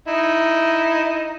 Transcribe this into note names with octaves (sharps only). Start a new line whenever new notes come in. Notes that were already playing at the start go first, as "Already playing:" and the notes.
D#4 E4